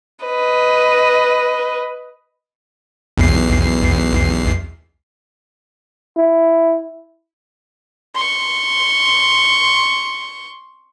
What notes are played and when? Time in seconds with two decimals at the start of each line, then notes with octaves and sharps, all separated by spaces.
0.25 B4 D#5
3.18 B1 E2 C7
6.17 E4
8.15 C6 C#6